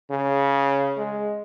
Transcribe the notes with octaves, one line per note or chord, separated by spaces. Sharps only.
C#3
G#3